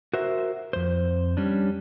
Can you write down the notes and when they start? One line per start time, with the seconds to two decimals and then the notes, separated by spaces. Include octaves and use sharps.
0.13 F#4 A#4 C5 E5
0.73 F2 C5
1.37 G3 C#4 D4